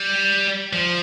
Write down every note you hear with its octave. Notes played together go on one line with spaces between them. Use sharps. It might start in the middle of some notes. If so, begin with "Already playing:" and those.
Already playing: G3
F3